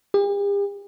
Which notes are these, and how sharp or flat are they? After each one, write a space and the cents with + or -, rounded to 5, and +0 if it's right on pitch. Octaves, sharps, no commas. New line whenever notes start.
G4 +45